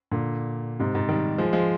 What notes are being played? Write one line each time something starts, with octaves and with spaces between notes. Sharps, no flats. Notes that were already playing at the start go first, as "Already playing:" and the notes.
A#2 D3
G#2 C3
G#2
D#3 G3
F3 G#3
F3 G#3